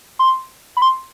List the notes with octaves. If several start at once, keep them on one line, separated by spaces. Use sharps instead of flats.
C6
B5
C6